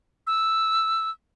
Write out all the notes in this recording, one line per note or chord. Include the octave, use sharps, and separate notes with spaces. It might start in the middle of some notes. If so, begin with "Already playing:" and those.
E6